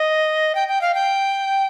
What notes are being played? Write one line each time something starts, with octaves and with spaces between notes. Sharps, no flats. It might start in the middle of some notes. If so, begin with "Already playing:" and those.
Already playing: D#5
G5
G5
F5
G5